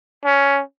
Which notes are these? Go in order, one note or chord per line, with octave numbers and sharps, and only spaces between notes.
C#4